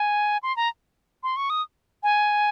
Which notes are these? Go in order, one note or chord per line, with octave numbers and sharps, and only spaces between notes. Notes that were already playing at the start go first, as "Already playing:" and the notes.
Already playing: G#5
C6
A#5
C6
C#6
D#6
G#5